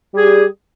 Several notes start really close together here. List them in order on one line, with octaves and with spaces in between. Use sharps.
G3 G#4 G4